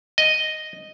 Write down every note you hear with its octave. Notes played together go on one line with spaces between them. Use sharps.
D#5